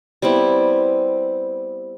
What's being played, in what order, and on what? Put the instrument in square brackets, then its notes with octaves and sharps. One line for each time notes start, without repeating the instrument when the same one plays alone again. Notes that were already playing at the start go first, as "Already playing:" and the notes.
[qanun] G3 B3 C4 E4